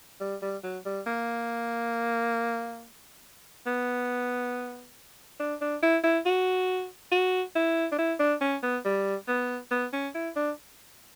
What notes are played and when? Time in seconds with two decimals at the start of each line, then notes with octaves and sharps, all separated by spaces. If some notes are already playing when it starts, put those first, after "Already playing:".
0.21 G3
0.42 G3
0.63 F#3
0.86 G3
1.07 A#3
3.67 B3
5.40 D4
5.61 D4
5.83 E4
6.04 E4
6.26 F#4
7.12 F#4
7.55 E4
7.92 D4
7.98 E4
8.19 D4
8.41 C#4
8.63 B3
8.85 G3
9.28 B3
9.71 B3
9.93 C#4
10.14 E4
10.36 D4